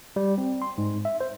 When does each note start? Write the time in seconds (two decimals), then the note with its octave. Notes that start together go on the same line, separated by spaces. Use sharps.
0.16 G3
0.38 C4
0.62 C6
0.78 G#2
1.05 E5
1.21 C5